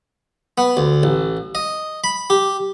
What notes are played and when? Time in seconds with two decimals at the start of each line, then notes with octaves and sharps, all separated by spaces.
0.58 B3
0.77 D2
1.03 A1
1.55 D#5
2.04 B5
2.30 G4